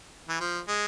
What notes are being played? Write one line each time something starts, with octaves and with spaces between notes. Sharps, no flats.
E3
F3
G#3